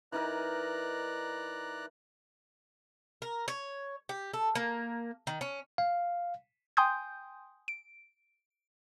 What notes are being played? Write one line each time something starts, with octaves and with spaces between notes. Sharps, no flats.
E3 D#4 A#4 D5 A#5 F#6
A#4
C#5
G4
A4
A#3
D#3
C#4
F5
G5 G#5 C6 D#6 G6
D7